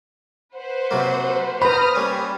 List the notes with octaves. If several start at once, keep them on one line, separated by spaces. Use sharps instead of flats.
B4 C5 F#5
C3 F#3 A#3
B4 C5 A#5 B5 D#6 F6
G3 A#3 C#4